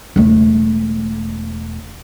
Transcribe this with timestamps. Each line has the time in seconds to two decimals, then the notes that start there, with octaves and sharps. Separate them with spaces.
0.16 E1 A3